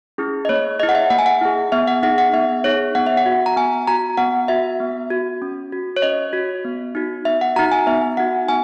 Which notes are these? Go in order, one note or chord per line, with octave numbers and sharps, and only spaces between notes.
C#4 E4 G#4
D#5
A#3 C#5
E4 G#4 D#5
F#5
E5
A#3 F#5
G#5
F#5
E4 G#4
B3 E5
F#5
D#4 G#4 F#5
F#5
B3 E5
D#4 G#4 C#5
B3 F#5
E5
F#5
F#4
A#5
B3 G#5
F#4 A#5
B3 F#5
F#4 E5
B3
F#4
C#4
F#4
C#5
C#4 D#5
F#4
B3
D#4 F#4
B3 E5
F#5
D#4 F#4 A#5
G#5
B3 E5
D#4 F#4 F#5
B3 G#5